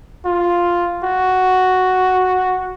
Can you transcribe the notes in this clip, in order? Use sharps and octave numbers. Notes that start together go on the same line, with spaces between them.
F4
F#4